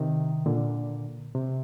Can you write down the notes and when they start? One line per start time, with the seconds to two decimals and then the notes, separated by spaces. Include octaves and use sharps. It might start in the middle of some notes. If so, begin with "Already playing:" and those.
Already playing: C3 D#3
0.46 A#2 D3
1.35 C3